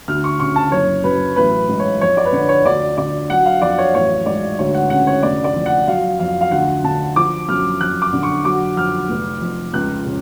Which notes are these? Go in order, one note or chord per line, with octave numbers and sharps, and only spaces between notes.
D2 F6
C#6
C#3 C#6
A5
F#1 C#5
F#2 B4
A1 B4
G#2
C#5
F2 C#5
D5
B4
D3 C#5
C#5
D2 D5
D3 D5
F#3 F#5
F5
F2 D5
C#5
A1 C#5
G#2 D5
D2 C#5
F#5
C#3 F#5
C#5
F1 D5
D5
F2
F#5
F#3 F5
F2 F5
F5
D2 F#5
D3 A5
F3 D6
F#2 F6
F2 F#6
D6
D3
C#6
F#3 D6
F2 F6
F1
F2
C#2 F#6
C#3